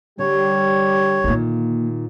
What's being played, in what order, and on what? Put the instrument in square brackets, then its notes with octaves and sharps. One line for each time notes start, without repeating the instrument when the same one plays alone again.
[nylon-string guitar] D3 [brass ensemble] G3 G4 [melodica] C#5
[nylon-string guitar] A#2 D#3 [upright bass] D3 A#3